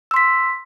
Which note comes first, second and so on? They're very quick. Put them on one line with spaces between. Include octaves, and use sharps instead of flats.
E6 C6 B6